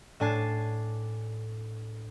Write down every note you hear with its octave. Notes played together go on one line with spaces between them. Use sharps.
A2 D4 G#5 A5 C7